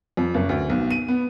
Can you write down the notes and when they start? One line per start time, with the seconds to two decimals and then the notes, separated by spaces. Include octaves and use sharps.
0.17 F2
0.34 F#1
0.49 D2
0.70 B1
0.90 D#7
1.08 B3